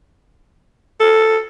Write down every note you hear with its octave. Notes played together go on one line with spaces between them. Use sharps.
A4